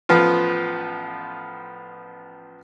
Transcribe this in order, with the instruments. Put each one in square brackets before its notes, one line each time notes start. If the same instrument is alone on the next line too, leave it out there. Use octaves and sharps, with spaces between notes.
[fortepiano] A1 F3 B3 F4